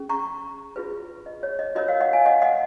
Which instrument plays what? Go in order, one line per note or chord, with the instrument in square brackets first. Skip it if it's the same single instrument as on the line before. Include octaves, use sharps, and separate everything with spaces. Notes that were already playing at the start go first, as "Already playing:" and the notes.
Already playing: [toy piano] C#4 G#4
A#5 C#6
F4 G#4 B4
D#5
C#5
D#5
F4 A#4 C#5 D#5
C#5 F5
D#5 F#5
F5 G#5
D#5 F#5
D#5 F#5